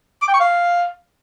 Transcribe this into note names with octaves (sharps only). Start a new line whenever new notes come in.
D6
G5
C#6
F5